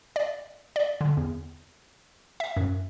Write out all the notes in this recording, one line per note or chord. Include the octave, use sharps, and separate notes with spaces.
D5
D5
D3
E2
E5
F#2